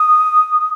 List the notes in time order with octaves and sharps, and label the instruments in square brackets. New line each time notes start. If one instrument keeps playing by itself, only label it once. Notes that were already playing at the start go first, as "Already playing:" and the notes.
Already playing: [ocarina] D#6